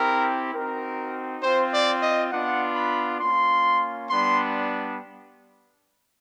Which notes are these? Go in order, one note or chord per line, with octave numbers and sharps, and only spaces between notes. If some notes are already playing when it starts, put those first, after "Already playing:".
Already playing: C4 E4 G4 A#4
C4 D#4 F#4 A#4
C4 F4 C5
D5
D#5
B3 D4 F4 F#5
B5
A#3 C#4 F4 C6
G3 B3 D4 C6